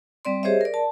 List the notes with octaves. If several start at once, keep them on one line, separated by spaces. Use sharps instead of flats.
G3 C4 D5 C6
G4 G#4 C5 C#5 D#5 E5
A#4 D5
A5